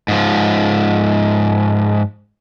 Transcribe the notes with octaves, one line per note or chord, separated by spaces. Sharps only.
G#2 F3